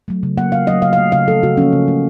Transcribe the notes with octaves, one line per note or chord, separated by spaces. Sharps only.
F#3 A3
C#3
F#3 A#3 F#5
C#3 F5
F#3 A3 D#5
C#3 F5
F5
A3
C#3 F5
F3 A3 A4
C#3 F#4
F3 A#3 C#4
C#3
A3